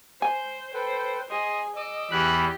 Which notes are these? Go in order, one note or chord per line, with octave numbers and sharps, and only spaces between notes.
C5 G#5
A4 B4 C5 G5
G#4 D#5 C6 D#6
D#5 D6 E6
E2 G4 B5 F#6